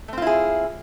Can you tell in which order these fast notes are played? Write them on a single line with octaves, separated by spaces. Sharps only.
A3 C4 F4 E4 G#4